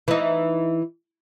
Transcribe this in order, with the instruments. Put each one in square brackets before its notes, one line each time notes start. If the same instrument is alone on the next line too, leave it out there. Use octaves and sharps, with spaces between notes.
[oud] E3 D#4